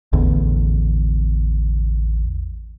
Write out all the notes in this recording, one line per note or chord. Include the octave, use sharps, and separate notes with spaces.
A1 E2 D3